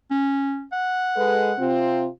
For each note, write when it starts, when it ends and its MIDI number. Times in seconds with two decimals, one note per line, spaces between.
0.11 0.64 61
0.72 1.75 78
1.16 1.51 56
1.16 1.51 69
1.16 1.51 71
1.59 2.08 48
1.59 2.08 60
1.59 2.08 65